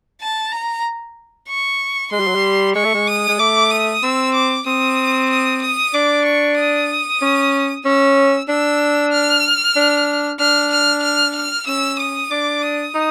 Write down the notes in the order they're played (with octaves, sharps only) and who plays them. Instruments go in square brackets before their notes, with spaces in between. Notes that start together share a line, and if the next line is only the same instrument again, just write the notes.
[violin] A5
A#5
C#6
[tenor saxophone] G#3 [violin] C6
[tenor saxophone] G3
F#3
G3
[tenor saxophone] G#3 [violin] C#6
[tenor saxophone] A3
G#3
[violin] D#6
[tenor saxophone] G#3
[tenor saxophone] A3 [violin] D6
[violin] D#6
[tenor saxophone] C4 [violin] E6
[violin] D6
[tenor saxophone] C4 [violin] D#6
[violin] D#6
D#6
[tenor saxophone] D4 [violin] D6
[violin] C#6
D#6
[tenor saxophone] C#4
[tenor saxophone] C#4 [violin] E6
[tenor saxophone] D4 [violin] E6
[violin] F6
[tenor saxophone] D4
[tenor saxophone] D4 [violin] F6
[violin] F6
F6
F6
[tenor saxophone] C#4 [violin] E6
[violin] D#6
[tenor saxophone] D4 [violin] D6
[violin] D#6
[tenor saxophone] D#4